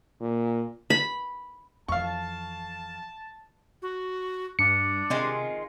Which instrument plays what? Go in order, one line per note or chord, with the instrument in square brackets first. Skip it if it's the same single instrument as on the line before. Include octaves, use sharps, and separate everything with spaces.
[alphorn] A#2
[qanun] B5
[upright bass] F2 E3 [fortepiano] F5 C#6 [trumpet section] A5
[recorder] F#4
[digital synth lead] G2 [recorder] D4 [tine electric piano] C#7
[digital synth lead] C3 [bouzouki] D#3 G#3 F4